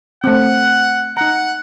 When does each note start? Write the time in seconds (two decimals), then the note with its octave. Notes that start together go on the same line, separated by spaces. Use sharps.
0.24 A3 C4 F#5
1.17 D#4 F#5 A#5